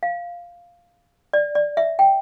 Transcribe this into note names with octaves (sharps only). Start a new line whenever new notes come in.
F5
D5
D5
E5
G5